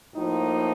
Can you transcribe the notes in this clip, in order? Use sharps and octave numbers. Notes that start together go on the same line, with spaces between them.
A2 F3 A#3 D#4